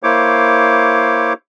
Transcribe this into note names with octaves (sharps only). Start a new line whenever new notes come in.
A#3 E4 C5 C#5 D6